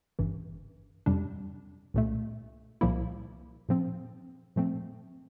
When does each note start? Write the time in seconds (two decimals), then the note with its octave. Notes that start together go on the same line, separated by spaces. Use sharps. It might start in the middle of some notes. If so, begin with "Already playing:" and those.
0.19 G1 G2 E3
1.06 F2 C3 G3 D4
1.94 C2 A#2 A3
2.81 C2 A#2 F3 A#3 E4
3.69 A#2 F3 C4
4.56 A#2 F3 A3 C4